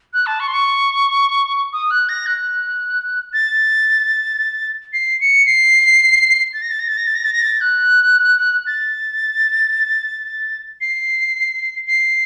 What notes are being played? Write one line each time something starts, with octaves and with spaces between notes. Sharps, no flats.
F#6
A5
C#6
C6
C#6
D#6
F#6
A#6
F#6
A6
C7
C#7
C7
A6
A#6
A6
A#6
A6
A#6
A6
A#6
A6
A#6
A6
F#6
A6
C7
C7